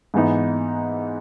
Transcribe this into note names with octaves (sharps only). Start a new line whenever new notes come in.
G#2 E3 B3 D#4